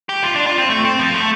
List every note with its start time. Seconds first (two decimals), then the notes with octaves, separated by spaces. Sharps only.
0.09 G4
0.24 F4
0.35 D4
0.47 F4
0.58 C4
0.70 A3
0.85 C4
0.99 F3
1.14 A3